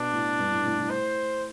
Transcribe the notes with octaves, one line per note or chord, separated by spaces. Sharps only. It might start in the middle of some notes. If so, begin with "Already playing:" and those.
Already playing: B2 D4
A2
G2
A2
A2
A2
C5